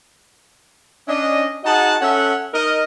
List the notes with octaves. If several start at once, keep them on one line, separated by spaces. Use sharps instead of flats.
C#4 D4 D#5
D#4 F#4 G#4 D#5 F#5 A5
C#4 A4 E5 F#5
D#4 A#4 D#5